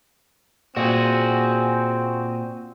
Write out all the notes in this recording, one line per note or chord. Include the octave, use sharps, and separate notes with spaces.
A#2 C4 F#4 G#4